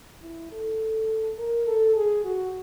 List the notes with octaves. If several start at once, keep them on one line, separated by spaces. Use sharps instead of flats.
E4
A4
A#4
A4
G#4
F#4